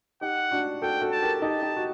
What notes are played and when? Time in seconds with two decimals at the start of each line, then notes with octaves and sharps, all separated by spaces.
0.21 D#4 G4 F#5
0.51 D4 F#4
0.82 F#4 A4 G5
1.02 F#4 A4
1.12 A5
1.22 G4 A#4
1.42 D#4 G4 A5
1.62 D#4 G4
1.77 F#4